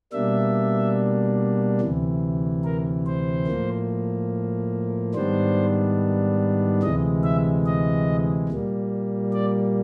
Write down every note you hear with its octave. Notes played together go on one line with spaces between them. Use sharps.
B2 G3 A#3 D4 E5
D2 C3 E3
A#4
C5
A2 F3 A#3
G#2 D#3 G3 B3 D4 C5
D2 C3 E3 G#3 D#5
E5
D#5
A#2 G3 A#3
D5